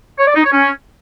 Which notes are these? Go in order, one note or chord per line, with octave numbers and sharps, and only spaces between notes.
C#5
D5
D#4
C#5
C#4